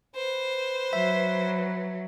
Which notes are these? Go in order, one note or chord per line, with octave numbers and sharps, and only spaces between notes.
B4 C5
F#3 E5